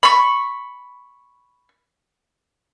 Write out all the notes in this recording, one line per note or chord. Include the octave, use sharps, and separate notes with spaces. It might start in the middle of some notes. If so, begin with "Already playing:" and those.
B5 C#6